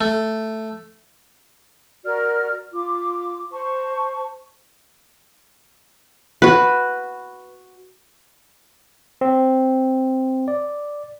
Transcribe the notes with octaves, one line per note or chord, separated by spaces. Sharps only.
A3
F#4 A#4 D5 F6
F4 D6
C5 A5 C#6
F#4 B4
C4
D5